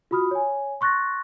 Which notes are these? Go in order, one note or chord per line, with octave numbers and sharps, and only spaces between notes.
F4 F#4 B5 D#6 F6
C#5 G#5
C6 C#6 F#6 A6 A#6